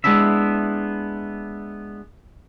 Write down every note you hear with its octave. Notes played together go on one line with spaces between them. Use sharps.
G#3 B3 D4 E4 E5